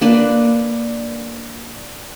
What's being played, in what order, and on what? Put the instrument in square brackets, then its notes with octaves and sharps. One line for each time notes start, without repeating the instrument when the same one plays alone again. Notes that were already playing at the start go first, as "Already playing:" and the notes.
[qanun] A#3 D4 B4 D5